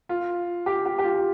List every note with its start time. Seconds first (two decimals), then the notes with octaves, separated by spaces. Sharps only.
0.09 F4
0.66 G4
0.86 G4
0.99 G4
1.04 F4